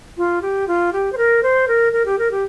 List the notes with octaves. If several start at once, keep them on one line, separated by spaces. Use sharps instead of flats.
F4
G4
F4
G4
C5
A#4
C5
A#4
A#4
G4
A#4
G4